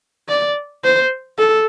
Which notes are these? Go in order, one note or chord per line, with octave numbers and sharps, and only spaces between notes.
D5
C5
A4